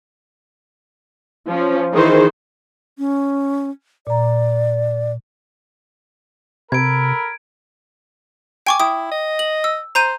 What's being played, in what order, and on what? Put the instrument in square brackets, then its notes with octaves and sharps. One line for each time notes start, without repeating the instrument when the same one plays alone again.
[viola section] F3 C#4
D#3 E3 D#4 G#4 C5
[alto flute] C#4
[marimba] A#2 A#5 [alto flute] D5
[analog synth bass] C3 [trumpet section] A4 A#4 B5 [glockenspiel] G#6 D7
[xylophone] G5 C#6 D6 [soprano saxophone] G#5
[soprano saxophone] E4 [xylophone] G5 D#6
[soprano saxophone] D#5
[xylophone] F#7
E6
[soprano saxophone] C5 [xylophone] A#5 G6 D#7